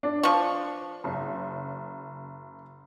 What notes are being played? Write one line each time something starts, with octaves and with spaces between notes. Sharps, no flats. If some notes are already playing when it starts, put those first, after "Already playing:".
D4
F3 C#6
F#1